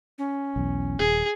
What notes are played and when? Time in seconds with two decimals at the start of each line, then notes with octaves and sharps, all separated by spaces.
0.18 C#4
0.56 B1 E2
0.99 D#1 G#4